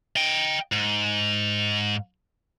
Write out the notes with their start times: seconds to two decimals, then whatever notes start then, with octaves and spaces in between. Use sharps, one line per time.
0.16 D#5 G5
0.72 G#2